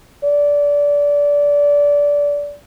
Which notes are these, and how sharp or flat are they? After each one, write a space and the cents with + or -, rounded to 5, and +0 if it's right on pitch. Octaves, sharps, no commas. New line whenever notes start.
D5 -20